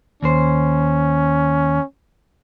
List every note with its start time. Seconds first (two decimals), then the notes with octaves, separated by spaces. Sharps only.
0.23 D#2 C#4 C5